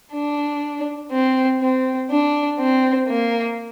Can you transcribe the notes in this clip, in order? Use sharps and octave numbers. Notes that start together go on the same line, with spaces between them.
D4
C4
C4
D4
C4
A#3